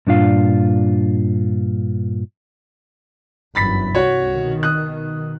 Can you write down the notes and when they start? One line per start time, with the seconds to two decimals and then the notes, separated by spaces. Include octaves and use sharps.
0.07 G2 A#2 D4 F4 F5
3.55 G1 F#2 E3 B5 A6 B6
3.95 C2 G2 F#4 C#5
4.30 B2 D#3
4.63 D#6 F#6